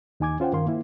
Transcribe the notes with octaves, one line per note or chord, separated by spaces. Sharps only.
D#2 D#4 G#5 D6 G#6
C#4 F4 C5 F#5 G5
G2 D#3 A#4 F5 C6
A#3 E4